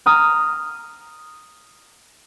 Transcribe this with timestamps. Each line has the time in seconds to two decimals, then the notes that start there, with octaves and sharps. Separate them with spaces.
0.06 A#5 D#6 F6